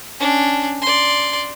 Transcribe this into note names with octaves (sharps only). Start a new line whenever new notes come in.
C#4 D4
D5 C6